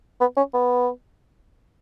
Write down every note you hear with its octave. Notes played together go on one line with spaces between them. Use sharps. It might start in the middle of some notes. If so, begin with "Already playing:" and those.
B3
C#4
B3